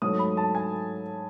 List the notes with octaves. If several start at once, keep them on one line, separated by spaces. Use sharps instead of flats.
G#2 F#3 A3 D#6
B5
A5
G#5